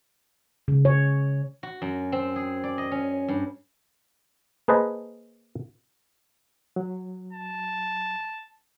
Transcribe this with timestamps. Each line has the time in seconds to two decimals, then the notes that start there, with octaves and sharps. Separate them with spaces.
0.68 C#3
0.85 C#5
1.63 F#4
1.82 F#2
2.12 C4
2.36 G#4
2.64 D5
2.78 D#5
2.91 C#4
3.28 G2
4.68 A#3 G#4 B4 C5 D#5 A5
6.76 F#3
7.33 A5